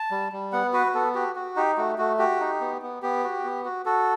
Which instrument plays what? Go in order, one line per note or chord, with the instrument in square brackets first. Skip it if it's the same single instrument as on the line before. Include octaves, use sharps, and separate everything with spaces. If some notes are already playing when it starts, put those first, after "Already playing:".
Already playing: [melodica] A5
G3
G3
B3 F#5
F#4 B4
B3 A4
F#4 G4
F#4
D#4 G4
A3 F#4
A3 F#4
F#4 G4
D#4
B3
B3
B3 G4
F#4
B3
F#4
F#4 A4